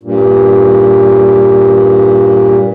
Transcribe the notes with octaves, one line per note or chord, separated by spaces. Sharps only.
G2 A#2